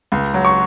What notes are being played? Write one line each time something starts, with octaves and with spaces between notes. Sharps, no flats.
C#2
F#3
C#6